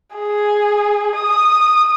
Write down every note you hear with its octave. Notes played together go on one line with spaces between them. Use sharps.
G#4
D#6